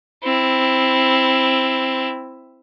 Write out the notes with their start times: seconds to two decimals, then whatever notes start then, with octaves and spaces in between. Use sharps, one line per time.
0.24 C4 E4